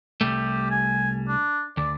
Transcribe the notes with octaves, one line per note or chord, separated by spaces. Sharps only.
C2 G3 A3 G4
G#5
D4
D2 D5